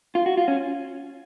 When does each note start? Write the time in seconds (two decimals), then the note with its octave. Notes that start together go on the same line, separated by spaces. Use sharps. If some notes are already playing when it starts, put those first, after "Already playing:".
0.15 F4
0.26 F#4
0.37 F4
0.48 C#4